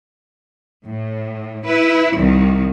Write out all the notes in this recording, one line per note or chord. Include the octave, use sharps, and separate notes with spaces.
A2
E4 B4
C2 D#3